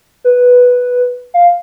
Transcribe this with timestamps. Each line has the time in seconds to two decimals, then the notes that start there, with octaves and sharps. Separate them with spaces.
0.24 B4
1.34 F5